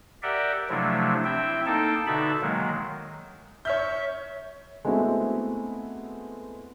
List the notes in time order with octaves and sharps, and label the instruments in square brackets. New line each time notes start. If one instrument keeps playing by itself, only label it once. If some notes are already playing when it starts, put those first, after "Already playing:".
[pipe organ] G4 A#4 D5 E5 F#5 G5
C3 F3 F#3 A3 D4 E4
C4 E4 E5 G5
A#3 D#4 A4 G5 A5
B2 D3 D#4 E5 A5 B5
D#3 F#3 G#3 A#3
[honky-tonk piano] C#5 F6 G6 [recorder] E5
[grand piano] G#3 A3 B3 C4 E4 F#4